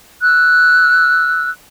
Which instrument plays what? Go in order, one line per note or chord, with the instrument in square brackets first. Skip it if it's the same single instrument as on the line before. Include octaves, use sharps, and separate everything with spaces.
[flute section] E6 F#6